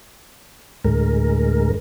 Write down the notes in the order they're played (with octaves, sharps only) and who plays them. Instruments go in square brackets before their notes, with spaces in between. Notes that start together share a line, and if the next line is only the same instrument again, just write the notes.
[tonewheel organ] D2 A2 G#3 A#4